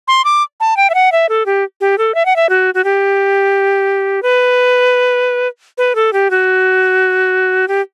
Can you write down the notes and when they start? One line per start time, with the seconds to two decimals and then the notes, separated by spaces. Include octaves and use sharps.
0.08 C6
0.25 D6
0.60 A5
0.77 G5
0.90 E5
0.94 F#5
1.12 E5
1.29 A4
1.46 G4
1.81 G4
1.98 A4
2.15 E5
2.25 F#5
2.36 E5
2.49 F#4
2.74 F#4
2.84 G4
4.22 B4
5.78 B4
5.95 A4
6.13 G4
6.30 F#4
7.68 G4